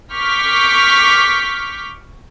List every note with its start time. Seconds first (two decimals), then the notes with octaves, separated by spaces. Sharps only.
0.13 C#6 D6 F6 G6 B6